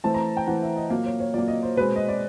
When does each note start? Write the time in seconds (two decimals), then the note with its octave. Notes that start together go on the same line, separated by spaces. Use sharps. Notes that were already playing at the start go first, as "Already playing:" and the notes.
0.04 E3 A3 C4 A5
0.14 A#5
0.37 G5
0.47 E3 A3 C4 F#5
0.62 E5
0.77 D#5
0.90 A#2 F#3 A#3
1.06 C#5
1.20 C#5
1.34 A#2 F#3 A#3 D5
1.48 D#5
1.63 C5
1.77 B2 G#3 C4 B4
1.96 D#5
2.09 D5